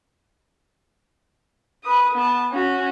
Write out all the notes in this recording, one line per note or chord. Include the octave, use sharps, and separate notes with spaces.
B4 D#6
B3 A5
C#4 F#4